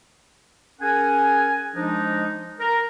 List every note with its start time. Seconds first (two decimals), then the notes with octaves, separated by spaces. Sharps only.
0.81 C#4 G#4 A#4 F#5 G#5
1.75 F3 G#3 D4 D#4
2.59 A#4